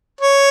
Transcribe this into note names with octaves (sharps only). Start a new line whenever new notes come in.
C#5